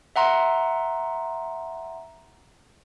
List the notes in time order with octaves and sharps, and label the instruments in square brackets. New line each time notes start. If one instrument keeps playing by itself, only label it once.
[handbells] E5 F#5 A#5 C6